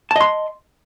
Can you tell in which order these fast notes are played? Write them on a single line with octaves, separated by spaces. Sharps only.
A5 D#5 C6